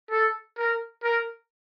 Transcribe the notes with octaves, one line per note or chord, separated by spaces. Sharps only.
A4
A#4
A#4